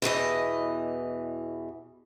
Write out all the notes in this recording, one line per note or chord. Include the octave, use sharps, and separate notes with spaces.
E2 B2 E3 D#5